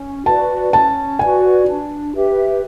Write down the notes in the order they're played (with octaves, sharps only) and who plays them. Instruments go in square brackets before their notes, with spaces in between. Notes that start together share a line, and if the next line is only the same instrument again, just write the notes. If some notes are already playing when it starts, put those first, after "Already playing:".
Already playing: [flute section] C#4
[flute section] F#4 B4 D5 [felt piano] A5
[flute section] C#4 [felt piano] A5
[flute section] F#4 B4 D5 [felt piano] G#5
[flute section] D4
G4 B4 E5